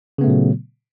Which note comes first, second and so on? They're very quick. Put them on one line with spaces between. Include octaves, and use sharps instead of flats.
C#3 B3 A3 A#2 F#3